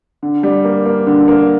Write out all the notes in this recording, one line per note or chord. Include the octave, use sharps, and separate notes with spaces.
D3
G3
A#3
A#3
D3
A#3